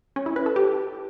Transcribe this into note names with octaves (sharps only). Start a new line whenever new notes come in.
C#4
E4
B4
A4
G4